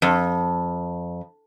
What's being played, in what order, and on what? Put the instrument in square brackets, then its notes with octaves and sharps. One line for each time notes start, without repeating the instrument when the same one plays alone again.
[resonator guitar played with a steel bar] F2